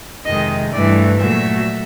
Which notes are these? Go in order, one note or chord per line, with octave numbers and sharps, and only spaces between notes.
F2 C3 D#3 G#3 D#5
G2 E3 A3 D5
A#2 F#3 A3 E5